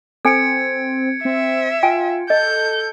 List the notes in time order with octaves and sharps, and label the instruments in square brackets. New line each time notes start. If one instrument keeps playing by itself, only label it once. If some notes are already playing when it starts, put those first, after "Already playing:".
[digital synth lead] C4 [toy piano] A4 G#5 [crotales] G#6 C#7 D7
[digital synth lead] C4 [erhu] E5
[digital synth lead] F4 [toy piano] G5 G#5
[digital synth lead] A4 [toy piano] D#5 [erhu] G6